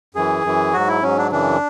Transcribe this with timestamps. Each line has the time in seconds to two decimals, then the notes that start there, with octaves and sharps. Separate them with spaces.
0.15 F#2 E3 G#4
0.44 F#2 E3
0.73 G#2 F#3 F#4
0.88 E4
1.02 G#2 F#3 C#4
1.18 D4
1.32 F#2 C#3 E3 D4